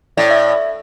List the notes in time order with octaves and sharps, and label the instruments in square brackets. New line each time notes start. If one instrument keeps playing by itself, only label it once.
[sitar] A2 [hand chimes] D5
[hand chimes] E5